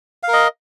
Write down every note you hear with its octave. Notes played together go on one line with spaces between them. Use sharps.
A#4 D#5 F5